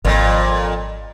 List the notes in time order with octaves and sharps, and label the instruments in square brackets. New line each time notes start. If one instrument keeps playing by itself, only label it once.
[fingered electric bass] G#1 [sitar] F2 A#2